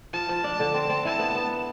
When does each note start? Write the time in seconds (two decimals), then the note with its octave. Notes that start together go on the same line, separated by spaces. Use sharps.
0.13 F3 A5
0.29 F3
0.44 D4
0.60 D3
0.74 C4
0.89 C4
1.05 E4 A5
1.19 B3
1.35 B3